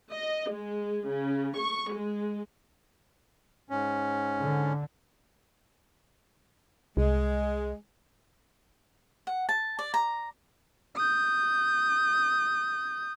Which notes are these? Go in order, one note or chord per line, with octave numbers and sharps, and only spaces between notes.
D#5
G#3
C#3
C#6
G#3
G#2 C#4
D3
C2 G#3
F#5
A5
D5
A#5
D#6 G6